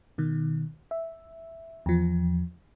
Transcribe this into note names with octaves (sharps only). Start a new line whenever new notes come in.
B2 D#3
E5
E2 F3